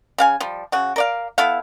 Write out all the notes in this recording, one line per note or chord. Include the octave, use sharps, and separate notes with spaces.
C#3 F5 G#5
F3 G3
C#3 F#4
A#4 D5 F5
B3 E4 A4 F5